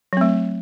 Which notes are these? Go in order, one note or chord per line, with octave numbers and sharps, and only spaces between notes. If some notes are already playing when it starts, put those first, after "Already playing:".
F#3 A3 C4